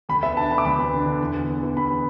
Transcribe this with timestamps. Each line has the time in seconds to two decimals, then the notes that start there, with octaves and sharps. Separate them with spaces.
0.09 D2 B5
0.23 B3 E5
0.37 D4 A5
0.51 D3 B5
0.58 D6
0.65 D2 B5
0.79 B3
0.93 D4
1.06 D3
1.21 E2
1.34 B3
1.49 E2
1.63 E3
1.76 E2 B5
1.90 B3